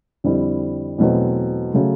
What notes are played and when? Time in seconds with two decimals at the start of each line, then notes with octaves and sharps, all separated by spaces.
0.24 F2 D3 G3 C4 E4
0.98 E2 B2 F#3 A3 C4
1.74 C#3 F#3 A3